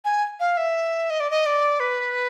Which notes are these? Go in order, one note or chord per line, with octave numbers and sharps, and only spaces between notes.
G#5
F5
E5
D#5
D5
D#5
D5
B4